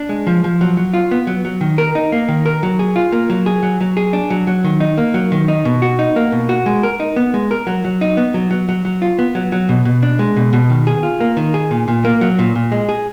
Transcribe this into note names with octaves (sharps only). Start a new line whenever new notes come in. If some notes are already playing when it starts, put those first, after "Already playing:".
Already playing: D4
G#3
F3
F3
F#3
F#3
F4
B3
F#3
F#3
D#3
A#4
D#4
A#3
D#3
A#4
F#3
G#4
F4
A#3
F#3
G#4
F#3
F#3
G#4
D4
F#3
F#3
D#3
D#4
A#3
F#3
D#3
D#4
B2
F#4
D#4
A#3
B2
F#4
G#3
A#4
D#4
B3
G#3
A#4
F#3
F#3
D#4
B3
F#3
F#3
F#3
F#3
F4
B3
F#3
F#3
B2
B2
D4
G#3
B2
B2
D#3
G#4
F4
A#3
D#3
G#4
A#2
A#2
A#3
F#3
A#2
A#2
G#3
G#4